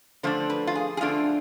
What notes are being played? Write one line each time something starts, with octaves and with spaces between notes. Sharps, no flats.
D3 F3 A3 D4 C5
B4
F4
G#4
G#4
D3 F3 A3 D4 F4